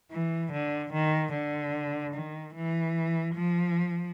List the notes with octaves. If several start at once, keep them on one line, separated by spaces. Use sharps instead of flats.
E3
D3
D#3
D3
D#3
E3
F3